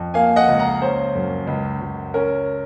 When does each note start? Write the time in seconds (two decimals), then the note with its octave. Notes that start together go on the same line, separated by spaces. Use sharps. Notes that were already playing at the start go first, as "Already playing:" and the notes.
Already playing: F2
0.14 A#3 F5 G#5
0.36 D#5 F#5
0.48 C#2
0.59 F#5 A#5
0.82 C#4 C5
1.15 F#2
1.47 C#2
1.81 C#2
2.14 C#4 A#4